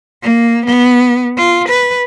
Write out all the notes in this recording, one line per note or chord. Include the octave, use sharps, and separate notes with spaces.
A#3
B3
F4
B4